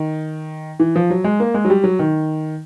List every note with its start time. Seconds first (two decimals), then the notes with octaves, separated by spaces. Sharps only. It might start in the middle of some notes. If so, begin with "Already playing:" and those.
Already playing: D#3
0.80 E3
0.96 F3
1.10 F#3
1.24 G#3
1.40 A#3
1.54 G#3
1.65 F#3
1.70 G3
1.84 F#3
1.99 D#3